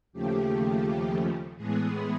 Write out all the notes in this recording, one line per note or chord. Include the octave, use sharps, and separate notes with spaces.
D#2 C#3 F3 A3 G4
A2 E3 G#3 B3 G#4